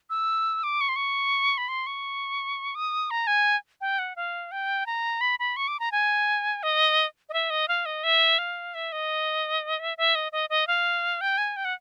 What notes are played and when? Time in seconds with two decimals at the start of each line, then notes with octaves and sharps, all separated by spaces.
0.10 E6
0.63 D6
0.81 C#6
0.89 C6
0.96 C#6
1.58 B5
1.68 C6
1.87 C#6
2.75 D#6
3.11 A#5
3.27 G#5
3.81 G5
3.99 F#5
4.16 F5
4.52 G5
4.86 A#5
5.21 B5
5.39 B5
5.56 C#6
5.68 D6
5.80 A#5
5.92 G#5
6.63 D#5
7.29 D#5
7.33 E5
7.50 D#5
7.68 F5
7.86 D#5
8.04 E5
8.39 F5
8.74 E5
8.92 D#5
9.79 E5
9.98 E5
10.15 D#5
10.32 D#5
10.50 D#5
10.67 F5
11.21 G5
11.38 G#5
11.56 G5
11.65 F#5